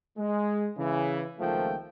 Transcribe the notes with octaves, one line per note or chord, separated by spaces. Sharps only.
G#3
C#3 E3
C#2 D#3 F3 A3 A#3 G5